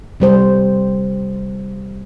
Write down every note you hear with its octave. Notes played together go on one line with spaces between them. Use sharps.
C3 G3 C5